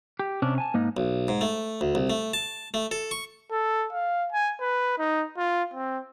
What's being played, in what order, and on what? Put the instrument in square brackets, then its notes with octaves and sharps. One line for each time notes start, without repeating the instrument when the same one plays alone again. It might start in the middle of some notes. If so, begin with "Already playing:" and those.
[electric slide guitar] G4
C3 C#4 D4
G#5 A5
G#2 A#3 D#4
[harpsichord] B1
G#2
A3
D2
C2
A3
A5
A3
A4
C#6
[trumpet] A4
F5
G#5
B4
D#4
F4
C4